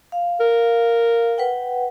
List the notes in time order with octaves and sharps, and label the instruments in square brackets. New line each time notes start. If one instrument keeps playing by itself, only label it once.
[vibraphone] F5
[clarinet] A#4
[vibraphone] B4 F#5 G5